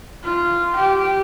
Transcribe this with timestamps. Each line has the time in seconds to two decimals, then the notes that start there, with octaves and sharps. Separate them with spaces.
0.23 F4
0.75 G4